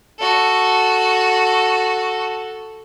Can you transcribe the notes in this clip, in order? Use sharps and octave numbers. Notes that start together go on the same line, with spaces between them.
F#4 A4